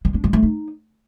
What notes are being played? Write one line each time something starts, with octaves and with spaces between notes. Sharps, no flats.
G#3
D4
G#3
A3
D#4